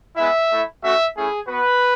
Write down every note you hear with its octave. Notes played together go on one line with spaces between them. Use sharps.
G#3 B3 E4 E5
A3 E4
A3 C#4 F#4 E5
A3 C#4 E4 G#4
B3 F#4 B4